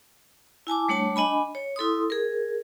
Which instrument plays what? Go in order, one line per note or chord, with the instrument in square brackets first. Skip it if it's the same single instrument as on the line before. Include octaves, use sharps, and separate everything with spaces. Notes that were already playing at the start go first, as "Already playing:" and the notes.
[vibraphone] E4 G#5 A5 D6
G3 A3 D4 C#5 A5
D4 D#5 G#5 B5
C#5
E4 A4 C6 D#6
G#4 A#4